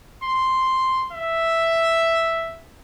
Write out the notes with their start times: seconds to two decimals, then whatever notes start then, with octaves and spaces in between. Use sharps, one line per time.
0.24 C6
1.13 E5